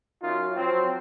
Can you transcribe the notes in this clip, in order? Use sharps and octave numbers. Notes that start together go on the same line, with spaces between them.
F#2 F#3 D#4 F4
F3 F#3 C4